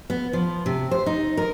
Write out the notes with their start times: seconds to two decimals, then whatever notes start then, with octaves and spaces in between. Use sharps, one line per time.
0.10 B3
0.33 F3
0.66 C3
0.91 C5
1.06 D#4
1.37 A#4